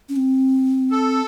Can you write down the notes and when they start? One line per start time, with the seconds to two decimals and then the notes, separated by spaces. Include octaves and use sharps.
0.09 C#4
0.16 C4
0.91 A4